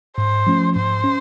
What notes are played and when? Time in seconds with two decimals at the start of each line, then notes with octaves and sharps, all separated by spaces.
0.17 G#2 C5
0.47 F3 A3 C#4
0.75 G#2 C5
1.04 C#4